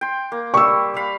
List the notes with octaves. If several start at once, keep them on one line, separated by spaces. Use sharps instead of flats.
G5 C6
A#3
G3 C#6 E6
F5 B5